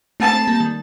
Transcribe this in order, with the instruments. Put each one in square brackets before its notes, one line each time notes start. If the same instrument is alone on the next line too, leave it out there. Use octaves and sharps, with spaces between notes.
[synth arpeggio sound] A3 C4 [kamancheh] A5
[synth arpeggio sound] A3 C4
G3 A#3
D#3 G3